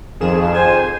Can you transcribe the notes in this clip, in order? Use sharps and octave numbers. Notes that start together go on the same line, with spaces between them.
F2 D#3 G#4 E7
C5 G#5